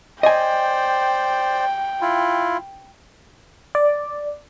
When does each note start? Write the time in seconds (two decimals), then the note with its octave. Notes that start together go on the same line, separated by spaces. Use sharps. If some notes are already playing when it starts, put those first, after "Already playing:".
0.23 C5 D5 D#5 G5 G#5
2.01 E4 F4
3.75 D5